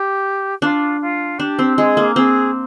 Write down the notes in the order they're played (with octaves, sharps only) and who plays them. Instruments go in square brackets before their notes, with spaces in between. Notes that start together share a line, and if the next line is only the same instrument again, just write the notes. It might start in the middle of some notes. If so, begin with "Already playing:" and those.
Already playing: [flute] G4
[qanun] D4 [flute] F4
[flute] F4
[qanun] D4 [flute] G4
[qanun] C4
[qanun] G#3 [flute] G#4
[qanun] A#3
[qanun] C4 [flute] G#4